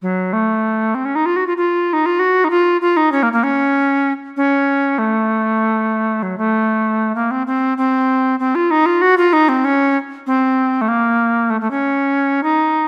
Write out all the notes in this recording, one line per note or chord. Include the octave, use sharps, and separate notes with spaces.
F#3
A3
C4
C#4
D#4
F4
F#4
F4
F4
D#4
F4
F#4
D#4
F4
F4
D#4
C#4
A#3
A#3
C#4
C#4
A3
F#3
A3
A#3
C4
C4
C4
C4
F4
D#4
F4
F#4
F4
D#4
C4
C#4
C4
A3
A#3
A3
A3
C#4
D#4